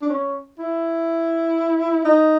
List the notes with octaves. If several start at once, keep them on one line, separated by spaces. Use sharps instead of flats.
D4
C#4
E4
D#4